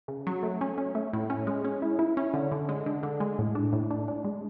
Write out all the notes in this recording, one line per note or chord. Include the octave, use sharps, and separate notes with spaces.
C#3
F#3
A3
C#4
C#4
A3
A2
C#4
G#3
C#4
E4
E4
C#4
D3
D3
G#3
D3
D3
G#3
A2
D4
A2
D4
D4
G#3